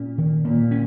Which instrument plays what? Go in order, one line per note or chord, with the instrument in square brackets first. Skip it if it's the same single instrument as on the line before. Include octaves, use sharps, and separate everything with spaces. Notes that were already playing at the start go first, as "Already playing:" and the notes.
Already playing: [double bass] A#2 [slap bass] C#4
[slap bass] D#3
[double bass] A#2 [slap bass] A#3
[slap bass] C#4